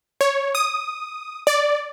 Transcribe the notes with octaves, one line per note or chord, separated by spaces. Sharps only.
C#5
D#6
D5